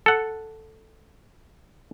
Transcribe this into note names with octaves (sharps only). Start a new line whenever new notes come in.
A4 F#5